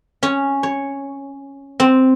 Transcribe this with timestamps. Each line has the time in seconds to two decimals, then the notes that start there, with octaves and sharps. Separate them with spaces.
0.23 C#4
0.63 C#5
1.80 C4